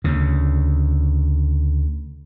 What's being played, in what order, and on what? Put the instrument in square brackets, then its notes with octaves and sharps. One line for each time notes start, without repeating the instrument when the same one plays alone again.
[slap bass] D2 C#3